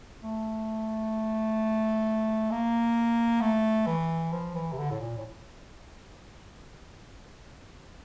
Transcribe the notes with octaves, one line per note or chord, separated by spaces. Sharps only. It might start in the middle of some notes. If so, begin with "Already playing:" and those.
A3
A#3
A3
E3
F3
E3
C3
D3
A2
A#2
A2